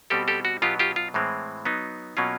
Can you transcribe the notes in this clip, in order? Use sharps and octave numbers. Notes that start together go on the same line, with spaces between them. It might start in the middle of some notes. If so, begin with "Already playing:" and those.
B2 G3 C4 G4 A4
G4 A4
F#4
B2 F#3 B3 F4 G4
F4 G4
F4
A2 E3 G#3 C4
F#3 B3 D#4
B2 F#3 A#3 C#4 F4